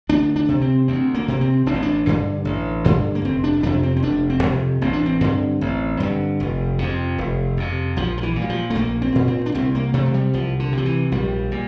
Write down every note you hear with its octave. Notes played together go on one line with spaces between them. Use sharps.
D2 D4
D4
C3
C4
D2 C4
A#3
C3 A#3
C4
A1 D4
C4
D4
G2 D3
A1
G2 D3
A#3
F1 C4
D4
F2 C3 D4
C4
C4
F1 D4
C4
F2 C3
A1 C4
D4
C4
G2 D3
A1
G2 D3
F1
F2 C3
F1
F2 C3
A#1 F3
F3
E3
A#2
G3
F3
A3
A#1 A#3
C4
A#2
C4
D4
C2 C4
A#3
C3 A3
F3
G3
C2 F3
D3
C3
F3
E3
A#1 G3
A#2